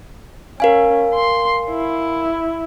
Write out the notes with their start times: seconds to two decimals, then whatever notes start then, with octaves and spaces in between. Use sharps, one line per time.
0.60 C#4 A#4 F5 G#5
1.15 C6
1.70 E4